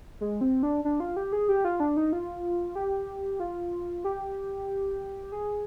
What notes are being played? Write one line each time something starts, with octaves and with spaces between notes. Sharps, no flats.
G#3
C4
D4
D4
F4
G4
G#4
G4
F4
D4
D#4
F4
G4
F4
G4
G#4